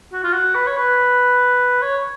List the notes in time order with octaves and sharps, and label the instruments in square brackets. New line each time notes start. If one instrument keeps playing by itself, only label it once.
[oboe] F#4
F4
F#4
B4
C#5
B4
C#5